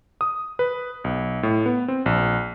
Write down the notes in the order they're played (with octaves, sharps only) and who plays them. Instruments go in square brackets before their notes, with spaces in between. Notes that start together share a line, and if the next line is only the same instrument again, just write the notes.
[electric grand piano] D#6
B4
B1
A2
B3
C4
A#1